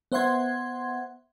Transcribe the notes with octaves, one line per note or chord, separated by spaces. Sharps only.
B3 C5 E5 F#5 C6 G#6